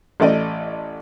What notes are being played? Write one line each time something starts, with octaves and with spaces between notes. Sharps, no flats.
A1 A3 D5 D#5